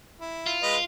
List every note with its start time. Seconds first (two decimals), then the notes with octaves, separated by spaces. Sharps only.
0.20 E4
0.46 F4
0.63 G#3 B4 D#5